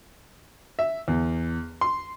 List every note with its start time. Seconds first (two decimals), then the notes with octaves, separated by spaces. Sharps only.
0.79 E5
1.08 E2
1.81 C6